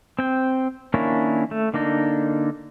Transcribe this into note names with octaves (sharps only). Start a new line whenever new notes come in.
C4 G5
D#3 A#3 C#4 D4 E4
A3
D3 A#3 D4 D#4